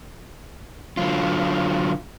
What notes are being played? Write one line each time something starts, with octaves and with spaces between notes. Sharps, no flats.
D3 F#3 F4